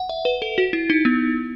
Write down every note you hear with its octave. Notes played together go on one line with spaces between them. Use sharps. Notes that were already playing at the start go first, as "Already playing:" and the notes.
Already playing: F#5
E5
B4
A4
F#4
E4
D#4
B3